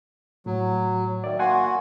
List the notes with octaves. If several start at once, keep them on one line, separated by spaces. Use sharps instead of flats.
A2 F#3
D#3 D5 E5
A#3 F#4 F#5 G#5 C6